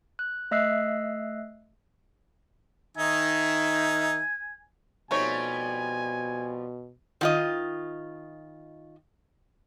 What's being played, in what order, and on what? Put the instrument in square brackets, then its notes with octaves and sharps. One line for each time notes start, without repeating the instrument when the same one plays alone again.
[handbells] F#6
A3 D#5 E5 E6 F#6 C7
[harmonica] D#3 D#4 E5 [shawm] G#5
[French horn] B2 [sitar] F3 G3 C4 [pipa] A3 D#4 C#5 [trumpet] G#5
[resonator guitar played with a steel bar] D#3 F4 D#5